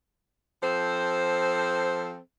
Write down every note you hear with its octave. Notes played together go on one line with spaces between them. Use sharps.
F3 C4 A4 C5